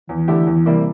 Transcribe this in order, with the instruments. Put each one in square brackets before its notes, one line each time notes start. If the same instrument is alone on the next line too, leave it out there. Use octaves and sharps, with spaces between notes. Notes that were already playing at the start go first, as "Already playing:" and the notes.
[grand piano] E2 [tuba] E3
[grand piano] D3 A3 E4 G4
E2
C3 G3 A#3 E4